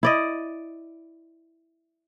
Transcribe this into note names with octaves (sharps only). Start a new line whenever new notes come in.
E4 D5 D#5